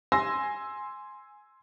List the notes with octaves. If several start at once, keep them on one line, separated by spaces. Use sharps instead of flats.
G#5 C6 E6 A#6